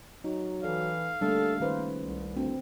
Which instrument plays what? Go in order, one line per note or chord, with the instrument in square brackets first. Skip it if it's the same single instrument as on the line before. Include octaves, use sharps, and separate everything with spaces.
[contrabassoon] F#3 [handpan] D#4
[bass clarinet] E3 [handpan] A4 D5 [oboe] F5
[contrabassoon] D3 [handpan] G3 A3 A#3 [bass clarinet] A4
[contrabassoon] C#2 [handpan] D#3 B4 C5 [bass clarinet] A#3
[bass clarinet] C2
[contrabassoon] D2 [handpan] C4